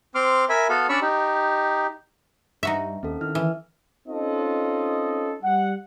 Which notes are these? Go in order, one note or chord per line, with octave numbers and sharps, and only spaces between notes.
C4 C6 D6 F6
A#4 E5 G#5 B5
B3 F#4 A4 F5
C#4 D4 D5 B5 C#6 E6
D#4 G4
G2 D#4 F#4 E5
G2
D#2 C4 C#4 A4
D#3 E4 F6
E3
C4 C#4 D#4 F4 A4 D#5
G3 F#5